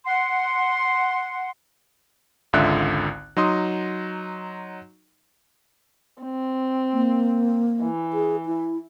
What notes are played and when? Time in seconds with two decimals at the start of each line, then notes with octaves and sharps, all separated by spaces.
0.05 F#5 C6
2.53 G#1 C#2 D3 F4 E5 F#6
3.37 F#3 D#4 C6 D#6
6.23 C4
6.93 A#3
7.83 E3
8.13 G#4
8.46 E4